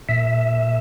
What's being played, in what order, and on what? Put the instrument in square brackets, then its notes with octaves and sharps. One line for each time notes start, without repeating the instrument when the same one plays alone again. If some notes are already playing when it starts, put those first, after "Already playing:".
[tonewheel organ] A#2 E5